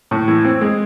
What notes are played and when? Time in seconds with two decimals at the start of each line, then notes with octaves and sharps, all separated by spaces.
0.11 A2
0.28 E3
0.45 C4
0.61 G#3